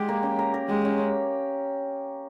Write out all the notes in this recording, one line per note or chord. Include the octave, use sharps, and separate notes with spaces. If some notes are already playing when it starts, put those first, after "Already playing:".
Already playing: G#3 G4
A#3
C#4
A#4
A#4
G#3 G4
C#4
C#4